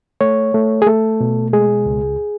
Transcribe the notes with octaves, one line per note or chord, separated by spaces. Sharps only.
A3 C#5
A3
G#4
A3 A4
B2
G#3 G#4
C#2